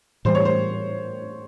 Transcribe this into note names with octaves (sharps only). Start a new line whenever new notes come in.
A2 E3 G3 C5
C#5
C5